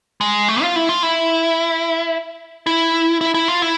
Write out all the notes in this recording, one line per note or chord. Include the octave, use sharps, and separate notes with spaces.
G#3
A3
F4
E4
F4
E4
E4
E4
E4
F4
E4